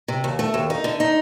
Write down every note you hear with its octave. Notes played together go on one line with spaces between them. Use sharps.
C3
D#2
A3
D#2
D#4
D3
D#4